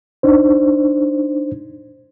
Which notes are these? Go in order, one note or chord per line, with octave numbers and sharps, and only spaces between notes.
D4 D#4 C5